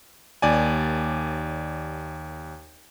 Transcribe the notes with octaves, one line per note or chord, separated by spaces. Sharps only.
D#2 D5 G#5